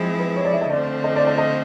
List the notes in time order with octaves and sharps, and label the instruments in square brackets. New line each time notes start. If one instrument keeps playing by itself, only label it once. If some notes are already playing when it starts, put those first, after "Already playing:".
Already playing: [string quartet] F3 G#3 C4 E4
[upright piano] B4
C#5
D5
E5
D#5
[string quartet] D3 F3 A3 C4 [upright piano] D5
[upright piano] D#5
D5
D#5
D#5